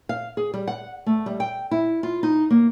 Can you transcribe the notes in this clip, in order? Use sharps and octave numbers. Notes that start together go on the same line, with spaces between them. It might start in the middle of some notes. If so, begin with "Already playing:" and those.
F5
G#4
G3
F#5
A3
G3
G5
E4
F4
D#4
A#3